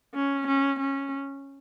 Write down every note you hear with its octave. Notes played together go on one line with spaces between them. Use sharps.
C#4
C#4
C#4